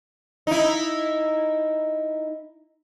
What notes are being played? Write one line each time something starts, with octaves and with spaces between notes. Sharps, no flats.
D#4 E4